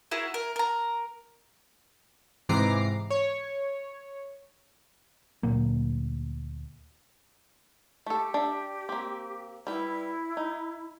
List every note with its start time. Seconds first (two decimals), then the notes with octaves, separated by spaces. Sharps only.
0.11 E4 F#4 G#4 A#4
0.34 A#4
0.56 A#4 A#5
2.49 G#2 C3 E3 A#5 D6 C7
3.10 C#5
5.43 D2 A#2 F#3 A#3
8.06 A3 G4 A4
8.34 D4 E5
8.89 A#3 C4
9.67 G3 E4 B4
10.37 D#4